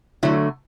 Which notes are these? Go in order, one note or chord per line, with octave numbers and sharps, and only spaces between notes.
D3 F#3 A3 E4